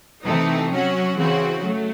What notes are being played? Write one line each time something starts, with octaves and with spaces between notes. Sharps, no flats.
C3 E3 A3 D#4
F#3 C#4 F#4
C#3 E3 C4 F#4
F#3 A3